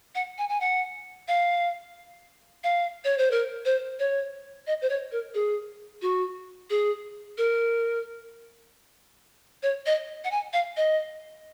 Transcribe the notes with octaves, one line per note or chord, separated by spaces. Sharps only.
F#5
G#5
G#5
F#5
F5
F5
C#5
C5
A#4
C5
C#5
D#5
C5
C#5
A#4
G#4
F#4
G#4
A#4
C#5
D#5
F#5
G#5
F5
D#5